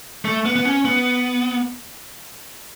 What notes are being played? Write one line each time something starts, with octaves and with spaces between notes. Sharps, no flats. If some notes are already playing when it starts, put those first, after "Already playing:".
A3
B3
B3
C#4
B3